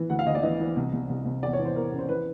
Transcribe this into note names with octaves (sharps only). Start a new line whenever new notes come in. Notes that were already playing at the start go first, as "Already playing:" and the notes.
Already playing: E3
D2 F#5
F5
D2 D#5
D5
E3 D#5
E3
C2
C2
C2
C2
E2 D5
C#5
E3
C5
E2 A#4
C#3
C5
E3 B4